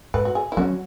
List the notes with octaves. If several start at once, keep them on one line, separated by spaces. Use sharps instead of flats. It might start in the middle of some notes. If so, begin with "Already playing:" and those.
G#2 B4
F#4
G#4
E4
F#3 C#4 F#4